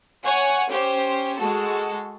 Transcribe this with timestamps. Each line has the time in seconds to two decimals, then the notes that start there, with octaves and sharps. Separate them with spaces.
0.24 C#5 F#5 G#5
0.69 C#4 G4 C5
1.38 G#3 F#4 A4